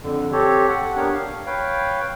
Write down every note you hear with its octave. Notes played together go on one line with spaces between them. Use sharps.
F2 D3
C4 G4 A4 C#5
F#5
B3 D4 G4 A#4 C#5
F5
B4 C#5 F5 G5